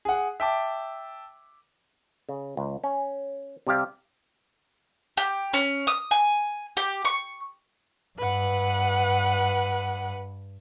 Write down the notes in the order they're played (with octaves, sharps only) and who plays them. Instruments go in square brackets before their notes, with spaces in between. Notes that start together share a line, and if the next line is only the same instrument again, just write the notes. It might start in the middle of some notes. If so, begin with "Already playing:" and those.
[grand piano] G#4 F#5
E5 G5 A5 D6
[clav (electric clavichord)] C#3
C#2
C#4
C3 G3 G4 F5
[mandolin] G4
C#4
D#6
G#5
G4
C#6
[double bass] G2 [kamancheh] B4 F#5